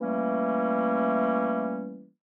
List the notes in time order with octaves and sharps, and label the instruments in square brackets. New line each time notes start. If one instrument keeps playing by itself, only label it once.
[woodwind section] E3 G3 A3 A#3 C#4